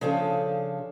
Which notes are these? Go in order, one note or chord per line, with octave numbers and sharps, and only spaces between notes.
C#3 F3 D4 G#4 A4